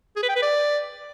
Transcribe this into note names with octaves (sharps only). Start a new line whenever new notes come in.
G#4
B4
G5
B4
D5